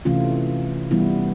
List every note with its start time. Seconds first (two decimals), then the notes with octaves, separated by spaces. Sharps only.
0.05 C3 E3 A3 C#4 F4
0.91 E3 G3 B3 E4